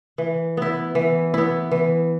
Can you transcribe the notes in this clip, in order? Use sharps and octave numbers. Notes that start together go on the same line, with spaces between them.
E3
B3 E4
E3
B3 E4
E3